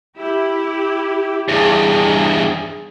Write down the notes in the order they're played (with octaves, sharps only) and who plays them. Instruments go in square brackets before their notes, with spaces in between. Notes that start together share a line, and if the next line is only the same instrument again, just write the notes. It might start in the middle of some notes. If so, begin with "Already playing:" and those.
[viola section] E4 G4
[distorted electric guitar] E2 G2 [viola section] G#4